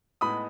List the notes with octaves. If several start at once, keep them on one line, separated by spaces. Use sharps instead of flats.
A2 G#3 B3 D#4 B5 D#6